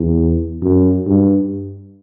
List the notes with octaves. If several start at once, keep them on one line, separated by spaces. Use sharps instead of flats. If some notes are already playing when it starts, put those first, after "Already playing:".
Already playing: E2
F#2
G2